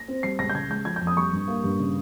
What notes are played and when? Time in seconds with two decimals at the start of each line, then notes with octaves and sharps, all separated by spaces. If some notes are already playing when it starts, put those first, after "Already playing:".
Already playing: A#6
0.08 C4
0.23 G3 C7
0.39 C#2 A#6
0.49 G6
0.54 C#3 G#6
0.70 G#3 G6
0.85 F3 G#6
0.96 F2 G6
1.07 D#6
1.17 G3 C#6
1.33 G2
1.48 A#3
1.64 G2
1.80 C#3